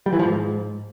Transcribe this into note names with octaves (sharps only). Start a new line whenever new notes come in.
G3
E3
F3
G#2